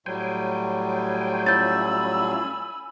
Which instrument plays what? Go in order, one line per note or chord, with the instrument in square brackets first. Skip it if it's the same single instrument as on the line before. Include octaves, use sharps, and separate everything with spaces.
[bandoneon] A2 F#3 G3 [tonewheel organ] C5 G5 G#5
[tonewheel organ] C#4 E4 F4 [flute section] G#5 B5 E6 [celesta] G6 A6